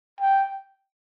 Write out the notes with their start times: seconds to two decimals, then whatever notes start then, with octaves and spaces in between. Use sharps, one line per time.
0.20 G5